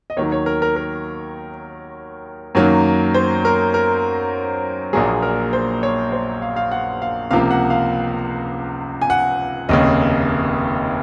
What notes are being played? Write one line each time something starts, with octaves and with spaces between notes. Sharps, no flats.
D#5
D#2 D#3 F#3 C#5
C#5
A#4
A#4
A#4
F#2 D#3 F#3 A#3
C5
A#4
A#4
A#1 A#2 F#3 A#3 G#4
A#4
C5
C#5
C5
F5
F5
F#5
F5
C#2 C3 F3 A#3 F5
F#5
F5
G#5
F#5
F1 D#2 C#3 D#5